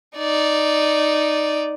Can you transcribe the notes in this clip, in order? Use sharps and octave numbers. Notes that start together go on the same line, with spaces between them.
D#4 D5